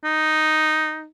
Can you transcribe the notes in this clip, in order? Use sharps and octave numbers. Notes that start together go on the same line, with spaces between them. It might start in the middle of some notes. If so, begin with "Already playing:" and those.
D#4